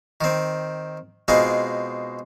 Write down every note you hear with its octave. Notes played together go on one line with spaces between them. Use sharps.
D#3 C4
B2 G#3 C4 D#4 F4